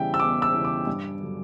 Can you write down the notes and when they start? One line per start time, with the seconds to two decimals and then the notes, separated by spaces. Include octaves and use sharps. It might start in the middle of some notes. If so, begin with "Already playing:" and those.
Already playing: E2 C#3 E3 G3 E5 G5
0.14 E6
0.20 E2 D6
0.42 E6
0.53 C#3 E3 G3
0.65 D6
0.87 G2
1.21 D3 F#3